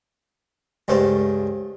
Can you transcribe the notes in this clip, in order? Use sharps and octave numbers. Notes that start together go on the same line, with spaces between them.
C#2 G2 A3 C5